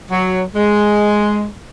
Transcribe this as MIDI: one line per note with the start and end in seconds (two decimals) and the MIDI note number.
0.11 0.42 54
0.55 1.45 56